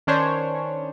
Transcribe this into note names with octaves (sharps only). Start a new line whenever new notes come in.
D#3 C#4 D4 C5 C#5